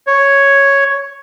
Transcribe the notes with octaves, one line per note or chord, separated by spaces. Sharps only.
C#5